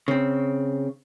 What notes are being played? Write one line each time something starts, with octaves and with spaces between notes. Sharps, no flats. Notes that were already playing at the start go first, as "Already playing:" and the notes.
C#3 C4